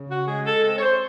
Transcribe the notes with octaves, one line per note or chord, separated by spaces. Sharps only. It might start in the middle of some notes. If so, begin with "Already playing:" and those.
Already playing: C#3
F#4
G#3 G#4
A4
C4 A4
C#5
C5